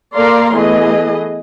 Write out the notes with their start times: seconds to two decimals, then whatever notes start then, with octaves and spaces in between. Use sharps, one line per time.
0.15 A#3 A4 D5 F5 A#5 C6
0.56 E3 A3 B3 G#4 D#5